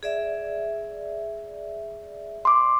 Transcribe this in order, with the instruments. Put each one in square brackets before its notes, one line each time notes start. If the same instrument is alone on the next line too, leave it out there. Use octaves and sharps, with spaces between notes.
[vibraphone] G#4 D5 E5
[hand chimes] C6 D6